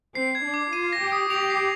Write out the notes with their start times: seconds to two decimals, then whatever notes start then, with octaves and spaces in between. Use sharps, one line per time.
0.15 C4 C7
0.35 G#6
0.45 D4
0.54 D6
0.73 F4 D#7
0.93 A#6
1.01 G4
1.12 D#6
1.30 G4 F7
1.50 C7